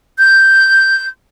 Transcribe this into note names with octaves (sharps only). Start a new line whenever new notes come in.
G6